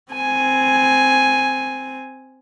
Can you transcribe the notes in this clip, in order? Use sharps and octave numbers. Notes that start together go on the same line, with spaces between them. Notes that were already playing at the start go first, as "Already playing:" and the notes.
C4 G#5